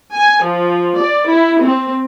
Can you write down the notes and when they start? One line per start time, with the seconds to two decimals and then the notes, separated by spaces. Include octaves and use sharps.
0.15 G#5
0.46 F3
0.98 D5
1.32 E4
1.64 C4